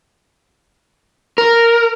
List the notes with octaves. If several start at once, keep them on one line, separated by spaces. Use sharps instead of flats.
A#4